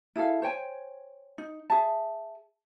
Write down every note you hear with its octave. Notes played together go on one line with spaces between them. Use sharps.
E4 G#4 A4 F5
C5 C#5 G5 G#5
D#4
G#4 E5 A5